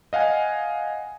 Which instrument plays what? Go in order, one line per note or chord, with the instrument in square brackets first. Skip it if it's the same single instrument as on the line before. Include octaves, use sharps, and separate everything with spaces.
[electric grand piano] D#5 F5 F#5 G#5